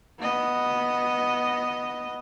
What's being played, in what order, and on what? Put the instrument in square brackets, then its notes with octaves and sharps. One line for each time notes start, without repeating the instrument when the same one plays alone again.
[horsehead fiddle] B3 D#5